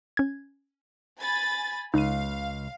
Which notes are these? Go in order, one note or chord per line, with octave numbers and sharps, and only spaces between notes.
C#4 G#6
G#5 B5 A6
C#2 D#4 F5 D#7